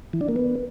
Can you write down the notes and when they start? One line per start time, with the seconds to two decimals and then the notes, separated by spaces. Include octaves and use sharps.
0.13 E3
0.21 D4
0.28 A#3
0.36 B3